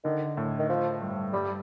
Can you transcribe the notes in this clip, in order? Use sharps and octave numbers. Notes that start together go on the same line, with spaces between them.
D3 D#3
A2
D#3
F3
G2
G2 G3